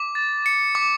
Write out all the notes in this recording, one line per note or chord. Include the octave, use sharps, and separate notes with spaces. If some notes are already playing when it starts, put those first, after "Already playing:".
Already playing: D6
A6
C#7
D6